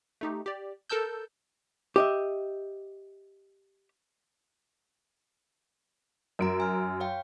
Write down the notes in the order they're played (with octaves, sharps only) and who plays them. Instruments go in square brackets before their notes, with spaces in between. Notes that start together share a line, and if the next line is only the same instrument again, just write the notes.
[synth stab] A3 D#4 G4
G4 D5
A4 A#4 A5 E6 G6
[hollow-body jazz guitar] G4 D#5 E5
[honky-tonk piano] F#2 D7 [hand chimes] A#4 A#5
[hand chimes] G#5 F6
C#5 F5 G5